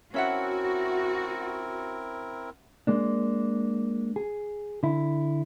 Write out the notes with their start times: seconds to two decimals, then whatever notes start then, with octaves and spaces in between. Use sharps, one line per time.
0.14 C4 C#4 E4 F#4 A#4 E5 F#5
2.87 G#3 A#3 D4
4.16 G#4
4.83 D3 E4